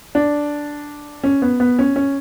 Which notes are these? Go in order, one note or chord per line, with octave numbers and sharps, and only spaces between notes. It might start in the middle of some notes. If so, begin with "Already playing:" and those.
D4
C#4
B3
B3
C#4
C#4